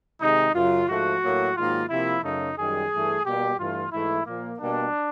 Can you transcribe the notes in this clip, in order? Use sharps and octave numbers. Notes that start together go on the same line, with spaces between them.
C3 D#3 G#3 D#4
F#2 C#3 F#3 F4
G#2 F3 A3 F#4
A2 F#3 A#3
G#2 D#3 F#3 A#3 F4
C3 F3 A#3 E4
F#2 C#3 F#3 A3 D#4
F#2 D#3 G3 G#4
G2 E3 A3
B2 G3 A#3 G4
G2 E3 A3 F4
G#2 E3 A3 E4
A#2 F3 A#3
B2 G3 A#3 D4